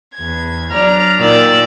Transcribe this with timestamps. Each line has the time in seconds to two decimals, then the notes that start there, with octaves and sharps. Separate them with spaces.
0.15 E2 G#6
0.71 F#3 D4 D5 A#5 F6
1.18 A#2 D#3 D5 E6